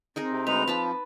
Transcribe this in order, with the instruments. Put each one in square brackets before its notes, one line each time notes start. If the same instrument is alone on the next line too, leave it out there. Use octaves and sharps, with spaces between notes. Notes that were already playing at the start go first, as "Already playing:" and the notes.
[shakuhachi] C4 [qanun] D#4 G#4 A#4
[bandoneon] C3
[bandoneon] D2 G#3 D#4 [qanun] B4 [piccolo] F7
[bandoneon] F3 [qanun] B4 A5 B5